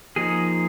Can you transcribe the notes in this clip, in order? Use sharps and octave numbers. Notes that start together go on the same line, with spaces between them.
F3 A#3 D#4 G#4